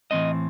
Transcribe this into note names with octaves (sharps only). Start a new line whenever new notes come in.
A2 E3 A3 C4 D#5